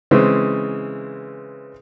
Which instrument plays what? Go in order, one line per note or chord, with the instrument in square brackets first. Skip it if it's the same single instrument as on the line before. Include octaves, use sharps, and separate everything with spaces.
[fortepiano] C#3 E3 G#3 C4